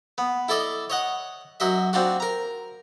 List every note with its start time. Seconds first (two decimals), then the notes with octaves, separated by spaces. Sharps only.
0.18 B3
0.49 E4 A4 D5 D#5
0.90 C#5 D#5 F#5
1.60 F#2 F#4 D#5 E5
1.93 C4 D4 F4 F#4
2.20 A#4 A#5